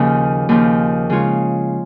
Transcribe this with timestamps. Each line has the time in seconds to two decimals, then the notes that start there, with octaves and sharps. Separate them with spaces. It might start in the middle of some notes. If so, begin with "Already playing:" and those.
Already playing: D#2 C#3 F3
0.49 D#2 C#3 F3
1.10 C#3 G#3 F4 C#5